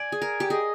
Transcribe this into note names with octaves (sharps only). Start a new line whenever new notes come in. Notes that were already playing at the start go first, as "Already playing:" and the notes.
Already playing: D5 G#5
G#4
A#4
G4
G#4 D#5